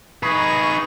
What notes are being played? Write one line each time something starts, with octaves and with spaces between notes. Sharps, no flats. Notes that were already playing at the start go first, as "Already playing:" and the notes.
D#4 G#4 B4 C#6